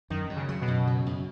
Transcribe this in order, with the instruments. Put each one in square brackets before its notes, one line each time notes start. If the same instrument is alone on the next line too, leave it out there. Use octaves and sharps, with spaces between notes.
[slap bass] F#2 [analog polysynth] D#3
[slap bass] F#2
[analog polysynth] C#3
[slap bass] F#3
[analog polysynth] B2
[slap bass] F#2
C#3
F#2